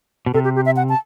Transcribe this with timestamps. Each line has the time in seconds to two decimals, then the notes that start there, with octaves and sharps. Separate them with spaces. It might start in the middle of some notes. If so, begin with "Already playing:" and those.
0.26 B2
0.34 C3 A4
0.44 G4
0.56 G4
0.65 E5
0.76 F#5
0.89 A5